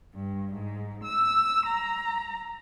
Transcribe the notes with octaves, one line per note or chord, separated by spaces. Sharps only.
G2
G#2
E6
A#5